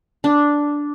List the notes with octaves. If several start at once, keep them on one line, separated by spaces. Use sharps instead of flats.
D4